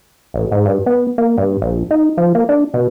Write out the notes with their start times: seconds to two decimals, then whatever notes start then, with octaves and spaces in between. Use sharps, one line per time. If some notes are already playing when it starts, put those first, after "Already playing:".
0.34 A1
0.51 G#2
0.66 G2
0.86 B3
1.18 A#3
1.38 G2
1.62 A#1
1.91 D#4
2.17 F3
2.35 A#3
2.49 D4
2.74 B2